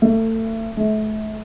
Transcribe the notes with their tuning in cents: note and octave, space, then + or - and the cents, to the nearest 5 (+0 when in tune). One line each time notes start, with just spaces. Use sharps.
A3 +30
A3 -35